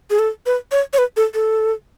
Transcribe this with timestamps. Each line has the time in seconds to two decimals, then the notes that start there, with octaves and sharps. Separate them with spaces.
0.10 G#4
0.19 A4
0.46 B4
0.72 C#5
0.93 C#5
0.98 B4
1.17 A4
1.34 A4